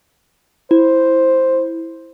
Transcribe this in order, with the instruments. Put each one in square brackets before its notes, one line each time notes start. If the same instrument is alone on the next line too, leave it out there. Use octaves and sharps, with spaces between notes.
[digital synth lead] E4 [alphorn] C5